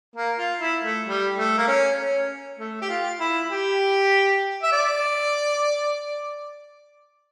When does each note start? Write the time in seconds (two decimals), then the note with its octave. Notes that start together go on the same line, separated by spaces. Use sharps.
0.16 A#3
0.38 F4
0.61 E4
0.84 A3
1.07 G3
1.37 A3
1.58 A#3
1.68 C#4
1.98 C#4
2.59 A3
2.82 G4
2.89 F4
3.20 E4
3.51 G4
4.63 E5
4.72 D5